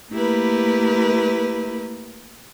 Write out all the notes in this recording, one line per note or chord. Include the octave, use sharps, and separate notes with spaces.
A3 A#3 E4 G4 A#4 B4